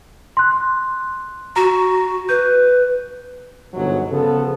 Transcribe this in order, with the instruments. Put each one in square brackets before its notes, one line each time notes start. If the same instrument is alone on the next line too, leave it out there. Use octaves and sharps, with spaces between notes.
[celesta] C6 F#6
[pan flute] F#4 [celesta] A#5
[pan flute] B4 [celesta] G6
[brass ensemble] G1 G#2 B2 F#3
C#3 F3 B3 A4